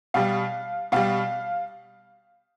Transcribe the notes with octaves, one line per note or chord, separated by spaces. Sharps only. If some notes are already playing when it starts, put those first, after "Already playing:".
B2 G3 F5
B2 G3 F5